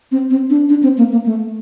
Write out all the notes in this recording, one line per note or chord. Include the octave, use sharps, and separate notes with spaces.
C4
C4
D4
D4
C4
A#3
A#3
A3